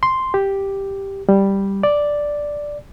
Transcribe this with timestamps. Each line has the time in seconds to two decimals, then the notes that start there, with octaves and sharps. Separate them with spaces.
0.03 C6
0.34 G4
1.29 G3
1.83 D5